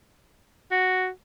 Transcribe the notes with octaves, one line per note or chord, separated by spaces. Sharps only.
F#4